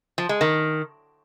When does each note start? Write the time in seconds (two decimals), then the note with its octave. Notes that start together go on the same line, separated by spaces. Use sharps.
0.18 F3
0.29 G#3
0.41 D#3